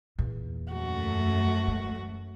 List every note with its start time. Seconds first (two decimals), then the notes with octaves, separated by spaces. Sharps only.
0.19 E2 A#2
0.72 F#2 A3 F#4
1.68 E3 G#3